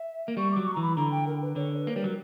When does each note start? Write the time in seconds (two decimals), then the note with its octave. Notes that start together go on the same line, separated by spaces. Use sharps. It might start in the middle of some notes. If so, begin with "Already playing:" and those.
Already playing: E5
0.28 A#3
0.37 G3 C#6
0.52 F#3 D6
0.67 C#6
0.74 A#5
0.77 E3 B5
0.96 D3 A#5
1.11 G5
1.27 A#4
1.42 B4
1.56 D3 C#5
1.77 B4
1.87 A#3
1.96 G3 A#4
2.04 F#3